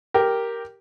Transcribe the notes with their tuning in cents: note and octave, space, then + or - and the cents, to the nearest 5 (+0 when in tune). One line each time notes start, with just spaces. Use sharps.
G4 +0 A#4 +0